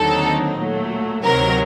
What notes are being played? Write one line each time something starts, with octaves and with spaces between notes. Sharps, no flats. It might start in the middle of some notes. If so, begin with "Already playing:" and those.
Already playing: D#2 D3 F#3 C4 D#4 A4
A#2 F#3 A3
D2 C3 D#3 F#3 A#4